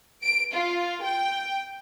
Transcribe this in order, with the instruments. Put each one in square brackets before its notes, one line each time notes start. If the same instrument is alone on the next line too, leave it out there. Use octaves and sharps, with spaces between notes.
[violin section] D7
F4
G5